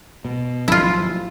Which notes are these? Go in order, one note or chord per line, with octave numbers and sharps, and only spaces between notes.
B2
G#1 F3 F#3 E4 F4